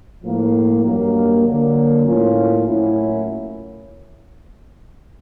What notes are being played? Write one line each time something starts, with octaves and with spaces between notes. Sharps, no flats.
A2 F3 A#3
G2 D#3 F#3 A#3
D3 F#3 A#3
A2 F3 A#3 C#4 F4
A2 F#3 A#3 C#4 E4